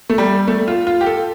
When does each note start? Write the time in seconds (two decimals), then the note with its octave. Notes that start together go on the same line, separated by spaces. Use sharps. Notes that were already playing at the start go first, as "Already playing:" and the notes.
0.10 A3
0.18 G3
0.48 A3
0.68 F4
0.87 F4
1.01 G4
1.06 A4